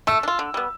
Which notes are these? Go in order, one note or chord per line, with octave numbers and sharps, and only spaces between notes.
A3 E6
D4
F4
D3
G3 B3